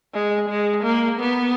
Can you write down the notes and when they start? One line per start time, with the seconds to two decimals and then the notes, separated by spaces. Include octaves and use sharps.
0.14 G#3
0.49 G#3
0.84 A#3
1.19 B3